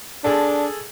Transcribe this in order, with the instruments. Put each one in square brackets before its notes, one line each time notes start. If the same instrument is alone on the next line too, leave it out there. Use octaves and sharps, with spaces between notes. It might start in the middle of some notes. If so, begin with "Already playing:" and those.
[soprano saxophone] D4 [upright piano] G#4 A4